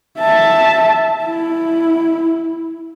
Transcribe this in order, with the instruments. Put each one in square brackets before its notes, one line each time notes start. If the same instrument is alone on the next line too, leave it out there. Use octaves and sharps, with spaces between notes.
[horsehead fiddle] E5 A5
E4